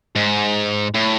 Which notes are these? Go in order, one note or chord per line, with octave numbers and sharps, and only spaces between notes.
G#2
A2